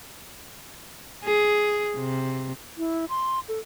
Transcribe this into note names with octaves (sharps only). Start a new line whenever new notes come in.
G#4
C3
E4
C6
A4